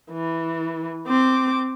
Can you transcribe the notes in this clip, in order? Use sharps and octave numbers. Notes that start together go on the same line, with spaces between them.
E3
C4 D6